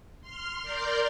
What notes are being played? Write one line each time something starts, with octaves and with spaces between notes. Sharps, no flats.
C6 F6
A#4 D5 C6 F6 G6